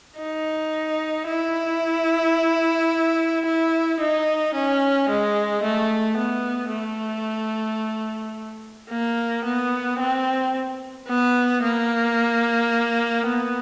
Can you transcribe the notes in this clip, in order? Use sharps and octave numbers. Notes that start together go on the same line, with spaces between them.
D#4
E4
E4
D#4
C#4
G#3
A3
B3
A3
A#3
B3
C4
B3
A#3
B3